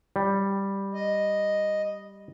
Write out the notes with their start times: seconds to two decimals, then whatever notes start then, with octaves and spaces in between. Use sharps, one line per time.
0.16 G3
0.94 D#5